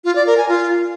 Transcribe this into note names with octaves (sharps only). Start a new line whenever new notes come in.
F4
D5
A#4
G#5
F4